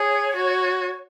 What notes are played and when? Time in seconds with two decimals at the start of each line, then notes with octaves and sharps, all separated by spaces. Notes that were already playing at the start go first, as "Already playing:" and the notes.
Already playing: G#4 C#5
0.36 F#4